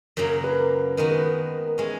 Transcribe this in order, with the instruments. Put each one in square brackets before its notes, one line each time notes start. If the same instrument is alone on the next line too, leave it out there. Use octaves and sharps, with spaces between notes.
[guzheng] F#2 C#3 F#3 A#3 [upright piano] A#4
[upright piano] A#4
B4
[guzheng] D#3 G#3 B3 F#4 [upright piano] A#4
[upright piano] B4
A#4
A#4
[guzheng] E3 G#3 C#4 [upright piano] G#4